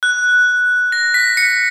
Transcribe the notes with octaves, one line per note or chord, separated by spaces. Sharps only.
F#6
A#6
B6
C#7